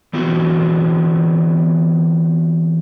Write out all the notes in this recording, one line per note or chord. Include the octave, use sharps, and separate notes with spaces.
E3 B3 C4 F4 F#4